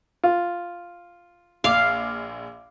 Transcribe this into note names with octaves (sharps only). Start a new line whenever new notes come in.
F4
A#1 F5 D6